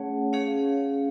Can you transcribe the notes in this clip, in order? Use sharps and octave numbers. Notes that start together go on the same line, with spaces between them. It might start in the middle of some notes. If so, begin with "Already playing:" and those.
Already playing: A3 C#4 G#4 C#5 F#5
C#4 G#4 C#5 F5